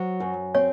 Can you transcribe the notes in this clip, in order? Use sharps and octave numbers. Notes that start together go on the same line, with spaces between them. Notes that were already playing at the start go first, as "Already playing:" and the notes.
Already playing: F#3 C5
F#2
C4 C#5